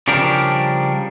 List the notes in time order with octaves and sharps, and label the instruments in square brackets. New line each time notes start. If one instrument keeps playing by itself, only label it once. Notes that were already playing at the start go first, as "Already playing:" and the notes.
[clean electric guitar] C#3 F3 G3 D4 A#4